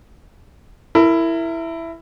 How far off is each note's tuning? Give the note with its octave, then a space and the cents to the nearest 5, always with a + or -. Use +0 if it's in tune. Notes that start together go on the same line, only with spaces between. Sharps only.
E4 +5 A#4 -30